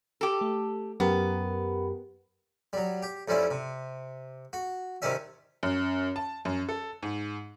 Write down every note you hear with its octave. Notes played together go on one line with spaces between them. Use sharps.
G4 A4
A3
F#2 B3 G4 A#4
F#3 G3
G4
F2 G3 C#4 D4 E4
C3
F#4
C3 D#3 G3 C#4 E5
F#2
A5
F#2
A4
G#2